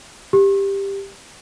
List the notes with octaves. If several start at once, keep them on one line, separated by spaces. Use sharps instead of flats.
G4